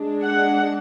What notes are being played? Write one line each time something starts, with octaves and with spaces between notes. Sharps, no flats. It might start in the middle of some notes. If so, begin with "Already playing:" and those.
Already playing: G#3 D4
F#5